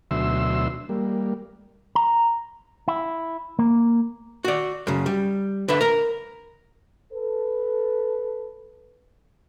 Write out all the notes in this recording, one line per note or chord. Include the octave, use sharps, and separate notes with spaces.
D2 B2 F#3 E5 C6 E6
G3 A#3
A#5
E4
A#3
F#4 D5
F#2 C#3
G3
D3 B4 E5
A#4 A#5
A4 B4